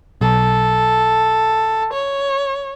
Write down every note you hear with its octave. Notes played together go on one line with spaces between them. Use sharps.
B1 A4
C#5